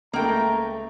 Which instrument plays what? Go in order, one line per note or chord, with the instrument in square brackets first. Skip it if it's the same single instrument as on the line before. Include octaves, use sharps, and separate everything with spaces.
[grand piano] C#2 A3 [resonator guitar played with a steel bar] A#3 G5 [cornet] A#5